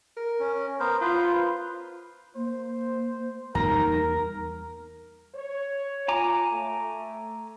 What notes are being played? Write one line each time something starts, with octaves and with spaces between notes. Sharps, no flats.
A#4
C#4
B3 A#4 C5
F4 B4 C5
A#3 C5
E2 G3 A#3 D#4 A#4 A#5
C#5
F4 G#5 A#5 D6
A3